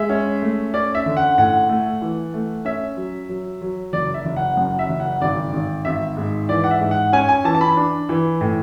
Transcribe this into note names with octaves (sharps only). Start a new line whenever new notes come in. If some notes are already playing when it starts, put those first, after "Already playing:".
Already playing: G#3 E5
C#4
A3
C#4 D5
E5
D3
F#5
A2 F#5
A3
E3
A3
C#4 E5
F#3
F#3
F#3
F#1 D5
E5
F#1
F#5
F#2 F#5
E5
F#1
F#5
G#1 D5
G#1
G#1 E5
G#2
E3 D5
F#5
E5
G#2
F#5
C#4 G#5
G#5
E3 A5
A5
B5
D4
E3
A2